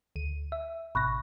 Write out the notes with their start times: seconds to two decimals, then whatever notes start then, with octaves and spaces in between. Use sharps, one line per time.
0.16 D2 D#7
0.52 E5
0.95 G#1 B2 B5 C#6 F#6 A#6